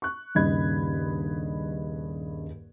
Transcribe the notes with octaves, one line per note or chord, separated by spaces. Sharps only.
C#6 F#6
D#1 G2 C#3 D#5 B5 G#6